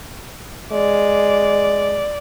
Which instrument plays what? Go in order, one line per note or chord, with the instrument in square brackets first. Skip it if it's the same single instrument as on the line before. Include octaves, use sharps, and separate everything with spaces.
[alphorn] G#3 [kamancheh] D5